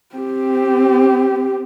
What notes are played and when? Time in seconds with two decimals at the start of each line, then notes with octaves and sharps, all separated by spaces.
0.15 C4 G4